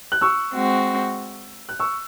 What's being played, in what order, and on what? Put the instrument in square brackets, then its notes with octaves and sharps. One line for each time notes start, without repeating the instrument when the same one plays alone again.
[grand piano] F#6
C#6 E6
[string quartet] G#3 C4 F#4
[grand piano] F#6
C#6 E6